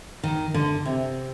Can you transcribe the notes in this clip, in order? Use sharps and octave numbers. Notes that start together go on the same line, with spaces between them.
D#3
D3
C3